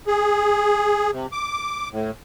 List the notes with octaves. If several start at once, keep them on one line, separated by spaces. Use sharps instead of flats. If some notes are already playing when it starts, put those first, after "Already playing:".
G#4
C3
D6
A2